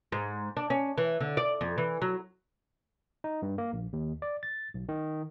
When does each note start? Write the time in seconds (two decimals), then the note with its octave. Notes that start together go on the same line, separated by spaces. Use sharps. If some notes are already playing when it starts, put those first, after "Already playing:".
0.12 G#2
0.57 D4
0.70 C#4
0.98 E3
1.20 D3
1.37 D5
1.61 F2
1.78 E3
2.02 F#3
3.24 D#4
3.42 G2
3.58 A#3
3.73 A#1
3.93 D#2
4.22 D5
4.43 A6
4.74 B1
4.89 D#3